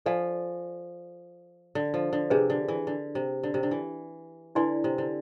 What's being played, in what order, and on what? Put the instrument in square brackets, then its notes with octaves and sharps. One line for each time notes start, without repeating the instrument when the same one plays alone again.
[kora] F3 [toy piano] A4 D5 F5 G#5
[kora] D3
F3
D3
[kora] C3 [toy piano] D4 G#4 B4
[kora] D3
E3
D3
C3
D3
C3
D3
E3
[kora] D3 [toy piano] E4 B4 D5 G#5 C6
[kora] C3
D3